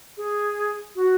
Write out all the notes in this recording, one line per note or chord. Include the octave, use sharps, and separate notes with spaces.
G#4
F#4